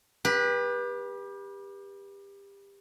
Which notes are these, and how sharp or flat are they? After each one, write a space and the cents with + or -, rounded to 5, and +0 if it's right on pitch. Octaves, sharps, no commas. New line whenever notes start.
G4 +25 B4 -25